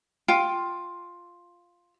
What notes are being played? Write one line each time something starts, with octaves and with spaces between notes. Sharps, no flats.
F4 G5